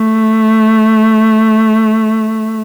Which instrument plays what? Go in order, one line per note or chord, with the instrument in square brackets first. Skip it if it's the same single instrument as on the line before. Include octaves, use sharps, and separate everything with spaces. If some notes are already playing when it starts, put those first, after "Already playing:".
Already playing: [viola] A3